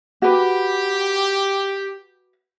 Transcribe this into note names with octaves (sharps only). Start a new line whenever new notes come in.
F#4 G4 B4